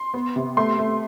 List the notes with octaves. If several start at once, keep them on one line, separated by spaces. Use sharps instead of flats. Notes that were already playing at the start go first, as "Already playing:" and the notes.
Already playing: C6
B3
C3
A3 C6
A3